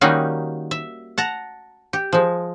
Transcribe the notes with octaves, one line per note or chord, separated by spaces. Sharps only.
D#3 G3 A#3 C#4 D#4 F#4
E5
F#5 A5 A#5
G4
F3 G#3